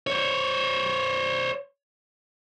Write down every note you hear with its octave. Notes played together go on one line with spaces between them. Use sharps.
C5 C#5